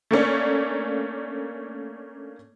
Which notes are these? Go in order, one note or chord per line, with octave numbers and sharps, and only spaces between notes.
A3 A#3 C#4 D4